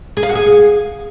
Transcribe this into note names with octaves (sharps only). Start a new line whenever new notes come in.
G#4
F5
F#4
G#4